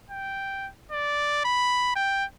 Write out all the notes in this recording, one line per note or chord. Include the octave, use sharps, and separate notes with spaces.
G5
D5
B5
G5